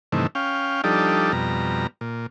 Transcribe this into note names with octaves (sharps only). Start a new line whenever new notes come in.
G2 C3 D#3 E3 A3
C#4 F5 G5
F3 G3 D4 D#4 G4 A4
F2 B2 G3 A#5
A#2